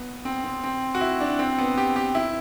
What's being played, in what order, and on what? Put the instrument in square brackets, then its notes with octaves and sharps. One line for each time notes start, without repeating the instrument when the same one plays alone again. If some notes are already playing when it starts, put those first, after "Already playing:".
Already playing: [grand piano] B3
C4
C4
C4
F#4
E4
D4
C4
B3
G4
G4
E4